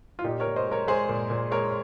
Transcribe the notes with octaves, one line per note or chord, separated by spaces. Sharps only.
F4
A#2 D#4 G4
A#4 C#5
A#2
C5 D#5
G#3
A#4 C#5
G#3 G#4 C5
A#2
A#2
G#3 A#4 C#5